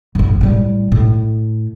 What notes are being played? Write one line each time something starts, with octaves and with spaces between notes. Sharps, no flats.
A1 F#2
A2 G3
A2